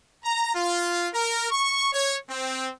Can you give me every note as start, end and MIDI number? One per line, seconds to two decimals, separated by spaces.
0.24 0.52 82
0.54 1.06 65
1.12 1.50 70
1.50 1.87 85
1.93 2.16 73
2.29 2.69 60